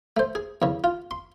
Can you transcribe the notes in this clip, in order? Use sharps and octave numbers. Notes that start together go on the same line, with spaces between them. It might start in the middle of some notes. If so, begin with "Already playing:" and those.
A3 C5
G#4
E2 C#3
F4
C6